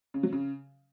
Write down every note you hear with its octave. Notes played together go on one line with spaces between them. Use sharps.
C#3
F#3
C#3